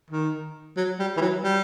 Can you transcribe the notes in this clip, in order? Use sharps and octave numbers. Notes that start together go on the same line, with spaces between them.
D#3
F#3
G3
E3
F#3
G3